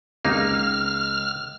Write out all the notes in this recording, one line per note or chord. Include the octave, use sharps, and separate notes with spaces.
C#2 A#3 D#4 F6